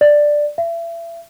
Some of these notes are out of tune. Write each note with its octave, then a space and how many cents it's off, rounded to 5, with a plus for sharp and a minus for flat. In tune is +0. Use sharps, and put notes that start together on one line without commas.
D5 +5
E5 +35